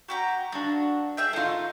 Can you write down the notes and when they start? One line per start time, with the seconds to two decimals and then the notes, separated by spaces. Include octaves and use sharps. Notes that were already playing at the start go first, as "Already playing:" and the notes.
0.08 F#4 G4 A#5
0.52 G2 D4 F#4
1.17 G#4 E5 G5
1.33 A2 A3 D#4 F4